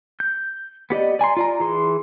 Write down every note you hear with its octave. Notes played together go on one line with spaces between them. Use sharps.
G6
B3 G4 D5 D#5
D5 G#5 A#5 C6
F4 D5 A#5
E3 G#4 C6